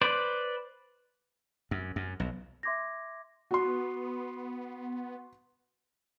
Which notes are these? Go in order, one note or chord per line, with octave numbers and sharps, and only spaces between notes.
B4 C5 D5
F#2
F#2
B1
E5 C6 D6 G#6 A#6
B3 F#4 C6